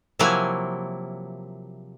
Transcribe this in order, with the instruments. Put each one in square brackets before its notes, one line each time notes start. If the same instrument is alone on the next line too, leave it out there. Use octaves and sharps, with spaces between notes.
[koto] C3 F3 F#3 A#3 E4 G#5